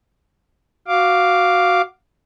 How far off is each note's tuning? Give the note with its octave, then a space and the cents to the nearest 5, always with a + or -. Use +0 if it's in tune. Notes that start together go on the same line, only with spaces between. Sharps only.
F#4 +0 F5 +0 D6 +0